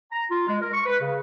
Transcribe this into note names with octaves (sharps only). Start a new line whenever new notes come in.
A#5
F4
G#3
A#4
C#6
B4
C#3